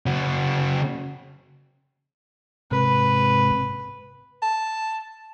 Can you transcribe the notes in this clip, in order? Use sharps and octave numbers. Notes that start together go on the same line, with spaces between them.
C#3 F#4
G#2 C3 B4
A5